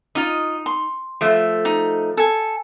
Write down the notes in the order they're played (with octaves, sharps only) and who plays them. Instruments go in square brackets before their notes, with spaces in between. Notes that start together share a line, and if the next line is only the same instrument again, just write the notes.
[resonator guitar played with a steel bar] D#4 [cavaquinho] F4 D#5
[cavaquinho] C6
[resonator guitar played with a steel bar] F3 A3
[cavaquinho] D#4
A4 G#5